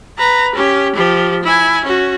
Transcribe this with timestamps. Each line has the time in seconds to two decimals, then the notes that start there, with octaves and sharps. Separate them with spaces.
0.18 B4 A#5
0.55 C#4 G4
0.96 F3 G4
1.43 E4 G#5
1.85 C#4 F#4